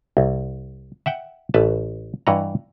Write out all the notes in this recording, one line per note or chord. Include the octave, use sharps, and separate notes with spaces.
C2
E5 F#5 G5
A1 B4 A5
G2 E3 D#5 F#5 A#5